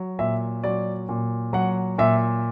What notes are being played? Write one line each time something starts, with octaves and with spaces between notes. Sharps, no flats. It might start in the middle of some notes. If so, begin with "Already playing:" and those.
Already playing: F#3
A#2 E5
F#3 D5
A#2
F#3 F#5
A#2 E5